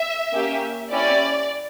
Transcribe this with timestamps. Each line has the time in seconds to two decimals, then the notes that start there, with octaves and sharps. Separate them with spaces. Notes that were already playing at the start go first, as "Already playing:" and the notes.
Already playing: E5
0.34 A#3 C#4 G4
0.92 C#4 E4 G4 D5